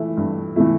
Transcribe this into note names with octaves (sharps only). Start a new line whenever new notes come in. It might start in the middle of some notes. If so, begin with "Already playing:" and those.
Already playing: E3 A3 E4
G2
E3 A3 E4